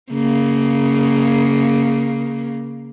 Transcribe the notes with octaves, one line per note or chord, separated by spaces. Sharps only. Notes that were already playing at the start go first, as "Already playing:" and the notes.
C#3 A#3